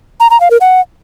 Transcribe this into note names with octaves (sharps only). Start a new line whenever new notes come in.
A#5
A#5
F5
A#4
F#5